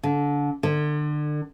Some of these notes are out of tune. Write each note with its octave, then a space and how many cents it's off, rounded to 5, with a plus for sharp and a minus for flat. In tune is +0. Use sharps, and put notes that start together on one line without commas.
D3 -25
D3 +30